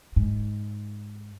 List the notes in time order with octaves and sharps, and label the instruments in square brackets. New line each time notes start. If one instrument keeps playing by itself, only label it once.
[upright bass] G#2